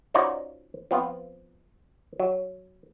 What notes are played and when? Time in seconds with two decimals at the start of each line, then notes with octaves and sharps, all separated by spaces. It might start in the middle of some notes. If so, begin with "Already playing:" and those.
0.14 C#4 D#4 F4 F#4 C5 D5
0.91 F3 B3 C4 F4
2.20 F#3